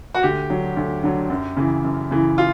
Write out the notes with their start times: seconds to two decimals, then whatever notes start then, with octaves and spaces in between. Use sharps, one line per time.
0.15 F#4
0.23 D2 G4
0.50 D3 F#3
0.77 D2
1.04 D3 F#3
1.30 F#2
1.57 C#3 E3
1.84 F#2
2.11 C#3 E3
2.38 F4